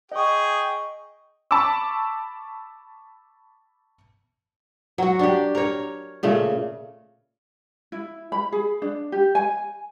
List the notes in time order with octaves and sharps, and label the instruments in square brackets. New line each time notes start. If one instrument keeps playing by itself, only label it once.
[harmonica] G#4 G5 [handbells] D#5 C#6
[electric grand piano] A5 B5 C#6 D6 E6
[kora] F#3 F#4
D4 G4
A#4 C#5
A#2 C#3 A3
[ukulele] E4
B5
G#4
D4
G4
G#5